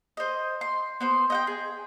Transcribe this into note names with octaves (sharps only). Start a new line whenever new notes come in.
C5 D#5
C6
B3 C5 C6
D#5 F#5 G5
G#4